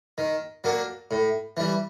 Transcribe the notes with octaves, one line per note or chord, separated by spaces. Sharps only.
D#3
F#3 A#3 D4
A2
E3 G3